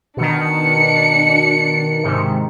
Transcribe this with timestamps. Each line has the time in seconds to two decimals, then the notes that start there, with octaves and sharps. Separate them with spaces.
0.17 B2 D#3 D4 C#7
2.03 G#2 C3 D#3